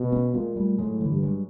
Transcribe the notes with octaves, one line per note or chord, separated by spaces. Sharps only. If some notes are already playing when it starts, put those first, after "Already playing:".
Already playing: B2
B3 C#4
A#2 G#3 A#3
G3 A3
A2 F#3 G#3
D3 E3
G2
F#3 G#3